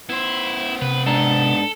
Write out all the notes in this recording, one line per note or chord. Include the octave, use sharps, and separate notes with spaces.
B3 E4 C5
C3 B4
G#2 D4 A4 A#5